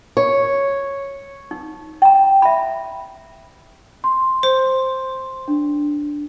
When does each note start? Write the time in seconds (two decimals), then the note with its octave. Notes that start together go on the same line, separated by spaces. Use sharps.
0.17 C#5
1.51 D#4
2.02 G5 A#5
2.42 E5 B5
4.04 C6
4.43 C5
5.48 D4